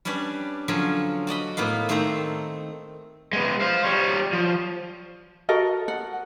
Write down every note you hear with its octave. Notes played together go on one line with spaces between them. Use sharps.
G3 C#4 D4 B4 D5
D3 F3 F#3 C#4
F#4 D5 D#5 B5
A2 A#3 B3 F5
D#3 A3 C4 C5 A#5
G#3 B3
C5 F5
G3 C#5
F3
F#4 A4 A#4 D#5
F#5